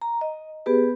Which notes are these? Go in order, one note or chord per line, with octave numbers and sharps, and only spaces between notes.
A#5
D#5
B3 G4 G#4 B4